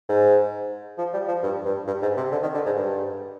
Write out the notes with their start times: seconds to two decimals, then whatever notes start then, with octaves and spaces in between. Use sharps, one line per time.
0.09 G#2
0.98 F3
1.13 G3
1.28 F3
1.43 G2
1.65 G2
1.87 G2
2.02 G#2
2.17 C3
2.32 D3
2.43 D#3
2.54 D3
2.66 G#2
2.76 G2